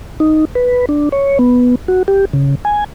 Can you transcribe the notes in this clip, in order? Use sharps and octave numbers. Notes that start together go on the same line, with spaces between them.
D#4
B4
D4
C#5
B3
F#4
G4
C#3
G#5